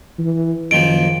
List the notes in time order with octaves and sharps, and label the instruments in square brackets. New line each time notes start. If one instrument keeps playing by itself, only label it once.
[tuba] E3
[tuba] F#1 [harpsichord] D#3 F3 A#3 [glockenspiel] D7